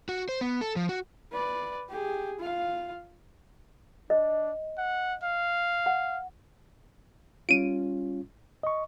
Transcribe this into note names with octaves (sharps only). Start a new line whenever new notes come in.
F#4
C5
B3
A4
F3
F#4
B4 D5
G4 G#4
F4 F5
D4 D#5
F#5
F5
F#5
G3 C#4 F4 D7 D#7
D#5 C#6